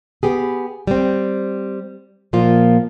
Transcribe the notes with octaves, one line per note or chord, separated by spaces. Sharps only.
B3 G4 G#4
G3 C4
A#2 F3 A#3 F4